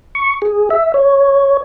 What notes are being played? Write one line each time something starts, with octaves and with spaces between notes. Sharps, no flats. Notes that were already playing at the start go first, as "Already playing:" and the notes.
C#6
G#4
E5
C#5